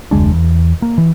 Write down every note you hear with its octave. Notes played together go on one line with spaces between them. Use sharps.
F1 D2 G#3 D4
E2
A#3
E3